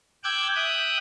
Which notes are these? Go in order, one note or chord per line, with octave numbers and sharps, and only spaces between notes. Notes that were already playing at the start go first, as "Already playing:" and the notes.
G5 D6 E6 F#6 G#6
E5 G5 D#6 F#6